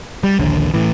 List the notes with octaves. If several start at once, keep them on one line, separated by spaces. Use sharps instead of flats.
G3
A#1 D#2 D3
A2 E3